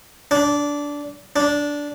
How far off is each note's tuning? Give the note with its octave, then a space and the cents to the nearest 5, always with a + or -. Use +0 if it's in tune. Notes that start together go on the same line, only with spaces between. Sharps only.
D4 -15
D4 -10